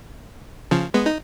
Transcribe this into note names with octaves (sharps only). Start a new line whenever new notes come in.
C#3 F3
G#3 B3
D#4